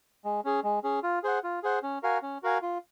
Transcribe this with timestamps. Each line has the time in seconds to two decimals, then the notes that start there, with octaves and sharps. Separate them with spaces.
0.25 G#3
0.45 C#4 G#4
0.63 G#3
0.84 C#4 G#4
1.03 F4
1.23 G#4 C5 F#5
1.44 F4
1.63 G#4 C5 F#5
1.83 C#4
2.03 F#4 A#4 F5 G#5
2.22 C#4
2.43 F#4 A#4 F5 G#5
2.62 F4